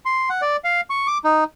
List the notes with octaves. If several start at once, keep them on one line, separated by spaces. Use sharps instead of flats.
C6
F#5
D5
F5
C#6
D6
D#4